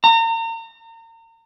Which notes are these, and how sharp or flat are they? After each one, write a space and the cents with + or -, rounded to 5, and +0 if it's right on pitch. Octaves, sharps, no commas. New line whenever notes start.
A#5 -35